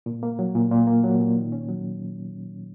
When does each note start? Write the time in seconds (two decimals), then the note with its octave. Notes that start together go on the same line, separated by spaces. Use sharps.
0.06 A#2
0.23 A#3
0.39 F#3
0.55 A#2
0.71 A#2
0.87 A#3
1.04 F#3
1.20 A#2
1.37 D#3
1.52 C#4
1.69 F#3